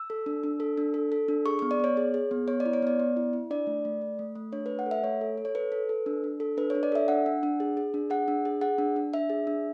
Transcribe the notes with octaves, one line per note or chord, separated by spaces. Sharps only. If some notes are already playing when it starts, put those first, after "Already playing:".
Already playing: E6
A4
D4
D4
A4
D4
A4
A4
D4
G#4 C#6
B3 C#6
D5
B3 C#5
G#4
G#4
B3
B3 C#5
D5
E4
C#5
B3 D5
B3
E4
E4
D4 D5
A3
A3
A3
A3
A3
D4 C#5
B4
A3
F#5
A4
E5
A3 C#5
A4
A4
C#5
A4 B4
A4
A4
D4
D4
A4
D4 B4
C#5
D4
D5
A4 E5
D4 F#5
D4
D4
G#4
G#4
D4
G#4 F#5
D4
G#4
G#4 F#5
D4
D4
D4 E5
G#4
D4